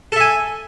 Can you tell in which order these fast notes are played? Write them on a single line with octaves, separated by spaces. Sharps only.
A4 E5 G#5